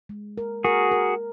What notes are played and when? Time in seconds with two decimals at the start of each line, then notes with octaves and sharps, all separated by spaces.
0.09 G#3
0.38 A#4
0.64 F#4 G#4 A#4
0.92 A#4